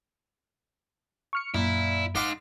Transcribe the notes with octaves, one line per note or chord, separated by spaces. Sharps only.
C#6 F6 C#7
F#2 A#2 E4
D#4 F5 F#5 C6 D6